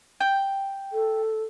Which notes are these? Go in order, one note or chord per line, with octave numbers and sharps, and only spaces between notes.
G5
A4